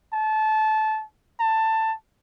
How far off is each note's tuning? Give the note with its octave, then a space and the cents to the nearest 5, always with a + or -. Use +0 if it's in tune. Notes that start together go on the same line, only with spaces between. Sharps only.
A5 -20
A5 +15